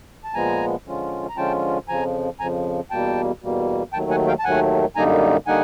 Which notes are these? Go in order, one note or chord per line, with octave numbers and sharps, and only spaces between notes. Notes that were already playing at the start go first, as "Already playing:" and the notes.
A5
A#2 F3 G#3 B3 G#5 A#5
D3 F3 G#3 C#4 F4
A#5
D3 F3 G#3 C#4 F4 G5 A5
F2 C#3 F3 G#5 A#5
F2 C#3 F3 G#5 A#5
E2 B2 G3 A#3 G5 A5
E2 B2 G3 A#3
D#2 D#3 F#3 A3 G5 A5
F#5 G#5
F5 G5
A5
D#2 D#3 F#3 A3 F#5 G#5
F#2 D3 G3 A#3 D#4 G#5 A#5
D3 G3 A#3 D#4 F#5 G#5